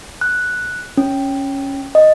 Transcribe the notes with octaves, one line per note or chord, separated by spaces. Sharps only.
F#6
C#4
D#5